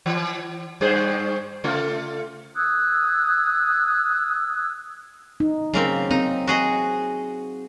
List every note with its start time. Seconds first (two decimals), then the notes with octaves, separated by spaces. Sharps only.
0.06 E3
0.81 G2 G#4 C5
1.64 C#3 A3 F4
2.56 D#6 E6 F#6 G#6
5.40 D#4
5.74 C#3 F#3 A#3 C4
6.11 C4 D#4
6.47 F#4 G#4 D#5